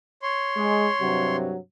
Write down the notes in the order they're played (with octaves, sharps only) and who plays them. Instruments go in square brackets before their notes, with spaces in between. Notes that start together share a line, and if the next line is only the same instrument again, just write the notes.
[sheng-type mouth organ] C#5 C6
[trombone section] G#3
G2 C3 F#3